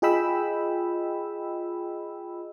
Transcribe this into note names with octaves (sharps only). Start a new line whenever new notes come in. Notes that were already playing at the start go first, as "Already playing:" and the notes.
F4 G#4 D#5 G5 B5 E6